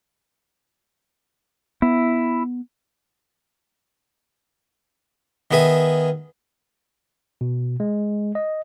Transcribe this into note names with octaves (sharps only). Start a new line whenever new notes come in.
B3 E4
D#3 B3 G#4 E5 G#5
B2
G#3
D#5